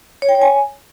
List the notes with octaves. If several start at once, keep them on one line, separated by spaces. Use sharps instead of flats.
C#5
G5
C#5
G#5